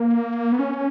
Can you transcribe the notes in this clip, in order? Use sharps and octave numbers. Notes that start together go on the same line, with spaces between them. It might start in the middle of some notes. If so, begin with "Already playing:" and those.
Already playing: A#3
B3
C#4